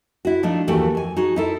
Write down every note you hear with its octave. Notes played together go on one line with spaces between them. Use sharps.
E4 F#4
F3 A3 D4 D#4
D#2 E3 A3 F#4 G4
F2 G#5
D#4 F#4 G#4
D#4 E4 A4